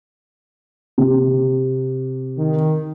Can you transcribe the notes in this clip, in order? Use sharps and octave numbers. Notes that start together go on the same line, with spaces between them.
C3
D#3